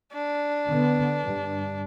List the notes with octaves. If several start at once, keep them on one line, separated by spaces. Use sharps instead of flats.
D4
D3 B3
G2